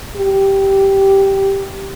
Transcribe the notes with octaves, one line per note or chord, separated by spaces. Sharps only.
G4